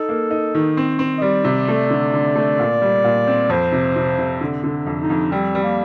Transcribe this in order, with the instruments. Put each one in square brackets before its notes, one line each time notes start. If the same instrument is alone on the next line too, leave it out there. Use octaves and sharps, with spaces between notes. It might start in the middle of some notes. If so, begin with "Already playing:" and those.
Already playing: [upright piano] D#4 [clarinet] A4
[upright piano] A#3
D#4
D#3
C4
C4
[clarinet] D#5
[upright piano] G3 [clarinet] D5
[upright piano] C3
A3
D3
D3
A3
A#2
G3
A#2
C4
[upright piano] F2 [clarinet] C5
[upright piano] C3
C3
C3
D3
D3
F2
[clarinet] D#4
[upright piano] F2
[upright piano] G3 [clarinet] C4
[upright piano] G3
[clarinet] A#3